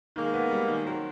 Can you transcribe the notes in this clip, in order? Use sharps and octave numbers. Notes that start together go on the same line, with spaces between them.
D#3 G#3 A#3
B3
G3
D#3
F#3 A#3 C4